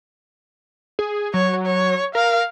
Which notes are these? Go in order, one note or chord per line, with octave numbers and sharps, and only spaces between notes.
G#4
F#3 C#5
C#5
A#4 F5